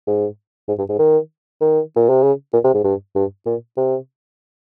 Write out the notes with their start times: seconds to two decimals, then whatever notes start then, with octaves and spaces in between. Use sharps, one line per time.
0.07 G#2
0.68 G#2
0.78 G2
0.89 G#2
0.99 D#3
1.61 D#3
1.96 A#2
2.09 C3
2.23 C#3
2.53 A#2
2.64 C3
2.74 G#2
2.84 G2
3.15 G2
3.46 A#2
3.77 C3